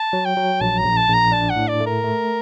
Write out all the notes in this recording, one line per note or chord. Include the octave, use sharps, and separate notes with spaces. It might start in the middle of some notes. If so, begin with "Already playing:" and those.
Already playing: A5
F#3
G5
F#3
A#1 A5
A#5
A#1
A5
A#1 A#5
D4 A5
F#5
A2
D5
A3
A#4
A3